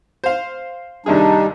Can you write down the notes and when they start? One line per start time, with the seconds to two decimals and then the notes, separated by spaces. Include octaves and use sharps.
0.24 C5 F5
1.06 D#2 C3 G3 D4 D#4 G#4